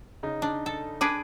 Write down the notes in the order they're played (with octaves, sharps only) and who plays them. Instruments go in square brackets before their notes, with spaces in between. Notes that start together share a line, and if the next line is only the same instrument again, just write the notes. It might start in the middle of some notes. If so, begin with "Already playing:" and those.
[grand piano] C#3 D#4
[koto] D4
A4
[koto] D4 G#4 B4 [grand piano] D6 D7